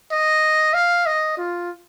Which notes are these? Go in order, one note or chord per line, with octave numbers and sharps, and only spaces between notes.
D#5
F5
D#5
F4